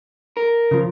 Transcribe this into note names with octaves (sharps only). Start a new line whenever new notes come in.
A#4
C#3 F3